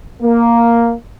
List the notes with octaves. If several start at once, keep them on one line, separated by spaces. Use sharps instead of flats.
A#3